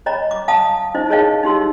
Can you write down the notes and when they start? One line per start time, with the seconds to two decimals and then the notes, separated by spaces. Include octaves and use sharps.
0.06 C#5 D#5 A#5 B5
0.31 D6
0.48 F5 A5 D#6
0.94 D#4 E4 C5 D#5
1.10 G#4 A#4 C#5 D#5 F5 A5
1.43 D#4 G4 C6 E6